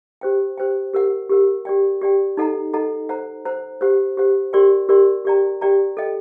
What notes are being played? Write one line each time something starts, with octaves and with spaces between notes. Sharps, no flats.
G4 C5 G5
G4 C5 G5
G4 A#4 F#5
G4 A#4 F#5
G4 D5 G5
G4 D5 G5
D#4 A4 D#5 F#5 A#5
D#4 A4 D#5 F#5 A#5
C5 F#5 A#5
C5 F#5 A#5
G4 C5 F#5
G4 C5 F#5
G4 A#4 D5 G5 C6
G4 A#4 D5 G5 C6
G4 D5 G5 A#5
G4 D5 G5 A#5
A4 D#5 G5